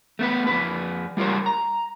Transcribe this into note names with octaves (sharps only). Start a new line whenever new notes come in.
A3 B3 B4
F2 B2 B4
G3 F4 A#4 C5 C#5
A#5